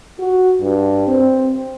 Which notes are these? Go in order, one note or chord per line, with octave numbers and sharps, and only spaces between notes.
F#4
G2
C4